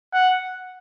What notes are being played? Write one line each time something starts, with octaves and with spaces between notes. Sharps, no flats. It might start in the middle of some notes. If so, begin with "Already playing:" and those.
F#5